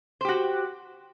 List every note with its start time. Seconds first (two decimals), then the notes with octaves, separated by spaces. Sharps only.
0.21 C5
0.25 G4
0.29 F#4